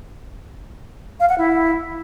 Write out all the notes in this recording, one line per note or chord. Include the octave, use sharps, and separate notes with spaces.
F5
F#5
E4